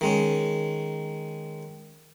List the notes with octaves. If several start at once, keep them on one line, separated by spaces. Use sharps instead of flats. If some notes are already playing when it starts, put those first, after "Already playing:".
D#3 G#3 C#4